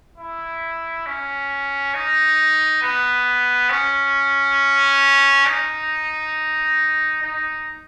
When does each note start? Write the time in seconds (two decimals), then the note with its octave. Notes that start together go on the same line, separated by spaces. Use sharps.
0.18 E4
1.06 C#4
1.94 D#4
2.82 B3
3.70 C#4
5.46 D#4
7.22 D#4